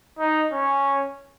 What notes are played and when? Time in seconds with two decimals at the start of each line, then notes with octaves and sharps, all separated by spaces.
0.19 D#4
0.52 C#4